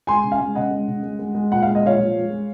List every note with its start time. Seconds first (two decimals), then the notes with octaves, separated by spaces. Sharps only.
0.07 G#3 G#5 C6
0.23 C#3
0.32 F5 G#5
0.40 G#3
0.55 C#3 D#5 F#5
0.71 G#3
0.88 C#3
1.03 G#3
1.19 G#3
1.35 G#3
1.51 A#2 F#5
1.63 G#3 F5
1.75 D#5
1.83 A#2 C#5 F5
1.99 F3
2.15 G#3
2.30 G#3